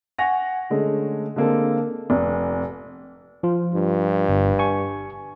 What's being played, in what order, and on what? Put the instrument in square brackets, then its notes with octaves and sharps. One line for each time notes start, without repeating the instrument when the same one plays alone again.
[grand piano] F#5 G#5 C#6 A#6 F7
D3 G#3 A3 C#4
D3 G#3 A#3 C4 A4
[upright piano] F1
[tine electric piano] F3 F4
[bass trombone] G2
[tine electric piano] G1
G#5 C#6